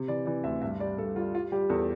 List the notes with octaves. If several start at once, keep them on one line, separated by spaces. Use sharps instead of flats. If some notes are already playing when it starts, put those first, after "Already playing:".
Already playing: C3
E3 D5
E3 D5
D2 E5
G2 E5
G3 D5
G2 A4
G3 F4
G3 F4
G3 G4
E2 A4